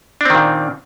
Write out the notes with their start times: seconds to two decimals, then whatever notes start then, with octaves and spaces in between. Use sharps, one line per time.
0.21 D4
0.25 C4
0.30 D#3
0.35 A#2